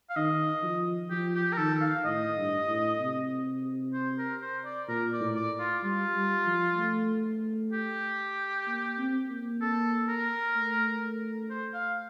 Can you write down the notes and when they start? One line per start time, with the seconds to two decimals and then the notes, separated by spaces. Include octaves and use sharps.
0.10 F5
0.16 D#3 D#5
0.63 F3
1.11 F3 G4
1.35 G4
1.52 A#4
1.58 D#3 A4
1.81 F5
2.05 A2 D#5
2.37 G2
2.68 A2
3.00 C3
3.94 C5
4.18 A#4
4.42 C5
4.65 D5
4.88 A#2 A#4
5.13 D5
5.20 A2
5.36 D5
5.59 F4
5.83 G3 F4
6.14 G3
6.46 F3
6.78 A3
7.73 G4
8.67 A#3
8.98 C4
9.30 A#3
9.61 A4
10.08 A#4
10.55 A3
11.50 C5
11.74 F5